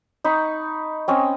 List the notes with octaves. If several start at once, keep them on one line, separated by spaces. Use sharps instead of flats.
D#4 B5 C#6
C4 C#4 D#5